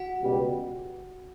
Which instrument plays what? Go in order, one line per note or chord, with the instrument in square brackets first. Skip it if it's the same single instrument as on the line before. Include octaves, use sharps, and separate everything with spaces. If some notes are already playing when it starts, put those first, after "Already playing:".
Already playing: [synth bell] F#4 F#5
[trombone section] C#2 B2 G3